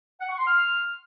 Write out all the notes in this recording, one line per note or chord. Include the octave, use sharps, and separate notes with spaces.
F#5
C#6
C6
F6